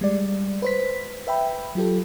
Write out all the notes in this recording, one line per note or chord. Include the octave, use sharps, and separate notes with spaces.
G3 G#3 D5
B4 C5 B6
B4 E5 G5 B5
F#3 F4 G4 A4